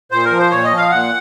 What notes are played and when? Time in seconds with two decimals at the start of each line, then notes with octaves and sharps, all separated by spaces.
0.11 A#2 C5
0.25 A#4
0.31 F3
0.39 C5
0.51 A#2 C#5
0.64 D#5
0.71 F3
0.77 F5
0.91 A#2 F#5